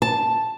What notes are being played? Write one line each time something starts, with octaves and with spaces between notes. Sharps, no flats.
A5